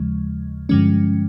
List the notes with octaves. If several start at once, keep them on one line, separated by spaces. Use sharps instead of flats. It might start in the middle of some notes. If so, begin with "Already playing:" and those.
Already playing: D#2 C#3 F3 G#3
G2 D3 F3 G#3 C#4